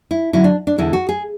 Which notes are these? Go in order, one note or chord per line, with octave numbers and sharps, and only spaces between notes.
E4
D3 F#3 C#4 E4
D4
D4
E2 D3 G#3 E4
F#4
G#4